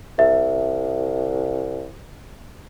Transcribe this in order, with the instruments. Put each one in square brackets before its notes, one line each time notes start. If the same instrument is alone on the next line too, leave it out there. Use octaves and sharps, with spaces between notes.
[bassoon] C2 [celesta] E5